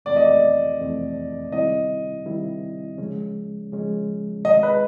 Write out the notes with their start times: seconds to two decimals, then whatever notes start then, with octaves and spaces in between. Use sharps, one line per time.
0.05 F2 C3 E3 A3 C4 D5
0.16 D#5
0.26 D5
0.79 F2 C3 E3 A3 C4
1.52 C3 D#3 G3 C4 E4 D#5
2.25 C3 D#3 G3 C4 E4
2.98 C#3 F3 G#3 C#4
3.72 C#3 F3 G#3 C#4
4.45 C3 D#3 G#3 D#5
4.63 B4